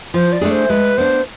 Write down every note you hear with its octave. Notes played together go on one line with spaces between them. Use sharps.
F3 C5
D5
A3 D4 G#4
C5
G#3 B4
B3 D4 C5